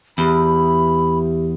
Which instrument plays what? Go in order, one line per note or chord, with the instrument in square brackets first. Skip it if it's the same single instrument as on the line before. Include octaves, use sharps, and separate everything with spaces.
[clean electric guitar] E2 [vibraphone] G4 [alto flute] B5